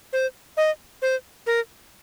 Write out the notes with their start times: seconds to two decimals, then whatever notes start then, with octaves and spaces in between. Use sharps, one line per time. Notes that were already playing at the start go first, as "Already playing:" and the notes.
0.13 C5
0.57 D#5
1.02 C5
1.46 A#4